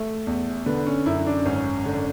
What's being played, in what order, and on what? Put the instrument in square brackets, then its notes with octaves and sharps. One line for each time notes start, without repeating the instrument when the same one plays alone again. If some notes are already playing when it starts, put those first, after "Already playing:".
Already playing: [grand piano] A3
E2
D3 B3
C#4
F#2 E4
D4
G#1 C#4
D3